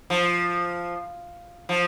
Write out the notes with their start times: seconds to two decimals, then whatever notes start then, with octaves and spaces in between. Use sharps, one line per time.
0.10 F3
1.69 F3